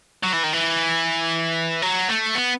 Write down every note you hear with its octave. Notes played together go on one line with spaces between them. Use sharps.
F#3
E3
D#3
E3
F#3
A3
B3